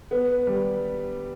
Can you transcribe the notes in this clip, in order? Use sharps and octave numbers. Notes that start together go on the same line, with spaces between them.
B3
G3